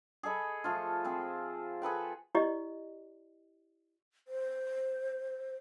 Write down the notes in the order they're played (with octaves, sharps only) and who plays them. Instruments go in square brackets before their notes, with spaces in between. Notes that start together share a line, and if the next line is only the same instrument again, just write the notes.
[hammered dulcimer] G#4 A4 D#5 B5
F3 A3 F4
C4 G#4 C5
G#4 A4 B4 G5
[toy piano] E4 G4 D5 D#5
[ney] C5